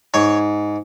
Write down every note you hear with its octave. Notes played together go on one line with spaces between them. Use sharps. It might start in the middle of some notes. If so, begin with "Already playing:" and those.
G#2 C#5